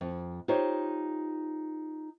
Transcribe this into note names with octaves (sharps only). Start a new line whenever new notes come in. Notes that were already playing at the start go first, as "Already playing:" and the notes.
F2
D#4 F4 G4 C5 C#5